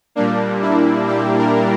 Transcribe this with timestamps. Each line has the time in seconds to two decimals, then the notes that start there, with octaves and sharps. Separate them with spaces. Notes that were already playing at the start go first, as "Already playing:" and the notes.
0.15 A#2 G3 A#3 D4
0.62 E4
1.07 G4
1.38 A#4